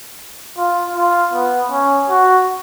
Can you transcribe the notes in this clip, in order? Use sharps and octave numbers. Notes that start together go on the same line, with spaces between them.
F4
F4
B3
C#4
F#4